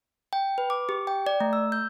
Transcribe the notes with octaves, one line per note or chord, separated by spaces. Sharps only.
G5
B4
D6
G4
G5
D5
A3
E6
G6